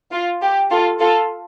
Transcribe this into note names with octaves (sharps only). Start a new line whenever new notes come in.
F4
G4
F4 A4
F4 A4